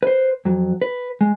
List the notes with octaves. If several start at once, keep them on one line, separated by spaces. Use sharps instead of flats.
B4 C5
F2 F#3
B4
G#3